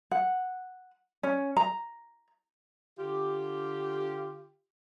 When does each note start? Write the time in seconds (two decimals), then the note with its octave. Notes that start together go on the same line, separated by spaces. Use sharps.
0.11 F#5
1.23 C#4
1.57 A#5
2.98 D3 F4 G4